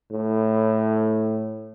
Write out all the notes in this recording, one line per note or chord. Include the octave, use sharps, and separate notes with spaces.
A2